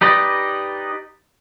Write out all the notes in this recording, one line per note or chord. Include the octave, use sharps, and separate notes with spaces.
D#4 G4 B4 D5 D#5